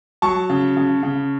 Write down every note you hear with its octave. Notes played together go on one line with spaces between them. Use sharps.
F#3 A5 C#6
C#3
C#3
C#3